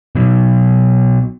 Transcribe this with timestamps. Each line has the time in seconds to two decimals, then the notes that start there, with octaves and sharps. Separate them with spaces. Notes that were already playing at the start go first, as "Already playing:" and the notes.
0.15 B2 F#3